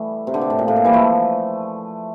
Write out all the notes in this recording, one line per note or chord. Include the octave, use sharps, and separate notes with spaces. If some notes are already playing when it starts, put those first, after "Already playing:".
Already playing: E3 G3 A3
C3
D3
C3
A2
A#2
A2
A#2
E3 G3
F3 A3